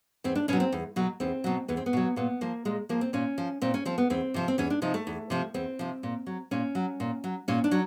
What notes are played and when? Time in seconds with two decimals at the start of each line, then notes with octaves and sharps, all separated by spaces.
0.24 E2 C4
0.35 D4
0.48 B2 F#3 C#4
0.60 C4
0.72 E2
0.96 B2 F#3
1.20 E2 C4
1.44 B2 F#3
1.68 E2 B3
1.77 C4
1.86 B3
1.93 B2 F#3
2.16 A#2 B3
2.41 F3 A#3
2.65 A#2 G#3
2.89 F3 A#3
3.01 C4
3.13 A#2 C#4
3.38 F3
3.62 A#2 C4
3.74 C#4
3.85 F3 C4
3.98 B3
4.10 E2 C4
4.34 C3 F3
4.48 C4
4.58 E2 C#4
4.70 D4
4.82 C3 F3 D#4
4.94 A3
5.07 E2
5.30 C3 F3
5.54 E2 C4
5.79 C3 F3
6.03 A#2
6.26 F#3
6.51 A#2 C#4
6.75 F#3
7.00 A#2
7.24 F#3
7.48 A#2 C#4
7.64 D4
7.71 F#3